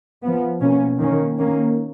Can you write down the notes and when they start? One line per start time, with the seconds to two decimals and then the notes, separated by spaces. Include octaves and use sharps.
0.23 F3 B3
0.61 B2 A#3 C#4
1.00 D#3 A#3 C#4
1.39 D#3 A#3 C#4